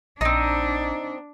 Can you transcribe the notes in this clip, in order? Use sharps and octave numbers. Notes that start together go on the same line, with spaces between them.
A#1 C4 D4 D#4